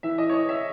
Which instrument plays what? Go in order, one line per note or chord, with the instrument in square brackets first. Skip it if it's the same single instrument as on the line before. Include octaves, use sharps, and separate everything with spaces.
[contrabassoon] E3 [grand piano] E5
[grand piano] D#5
C#5
D#5
E5